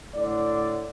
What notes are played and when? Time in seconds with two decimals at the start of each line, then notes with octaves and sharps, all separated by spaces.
0.15 A2 D3 D5